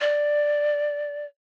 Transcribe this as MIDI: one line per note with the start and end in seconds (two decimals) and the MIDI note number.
0.01 1.26 74